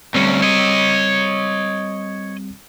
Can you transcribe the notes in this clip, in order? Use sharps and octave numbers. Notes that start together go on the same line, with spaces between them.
D2 G3 C4 C#4
C#5 D#5